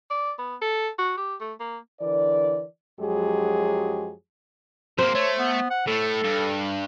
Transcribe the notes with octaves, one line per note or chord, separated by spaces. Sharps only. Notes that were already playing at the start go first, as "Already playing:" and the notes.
D5
B3
A4
F#4
G4
A3
A#3
D3 E3 A#4 D5
F#2 F3 F#3 G#3 G4 G#4
C3 A#3 C5
A3 C#5
B3
F#5
A2 A3 A4
G2